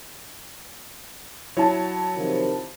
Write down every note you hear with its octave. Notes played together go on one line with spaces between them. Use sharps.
F#3 E4 C#5 A5
C3 D#3 F3